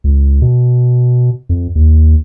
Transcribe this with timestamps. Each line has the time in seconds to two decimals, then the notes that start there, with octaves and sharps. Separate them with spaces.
0.04 C#2
0.42 B2
1.49 F2
1.75 D#2